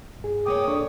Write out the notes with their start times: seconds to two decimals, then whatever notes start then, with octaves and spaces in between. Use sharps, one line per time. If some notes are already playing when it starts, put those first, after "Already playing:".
0.20 G2 G#4
0.46 C3 A#3 C#5 G5 D6 D#6
0.68 D4 A4 D5 C#6